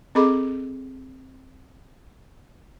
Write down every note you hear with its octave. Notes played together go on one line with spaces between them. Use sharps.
C4 G#4 A4 D#5 B5 D6